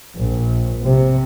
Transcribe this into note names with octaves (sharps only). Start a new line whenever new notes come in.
A#1
C3